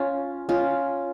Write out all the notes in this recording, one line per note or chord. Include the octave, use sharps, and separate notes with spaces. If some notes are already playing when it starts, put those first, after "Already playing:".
Already playing: C#4 F4
C#4 F4